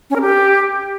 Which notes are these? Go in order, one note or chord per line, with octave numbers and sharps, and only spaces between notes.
C#4
A#4
G4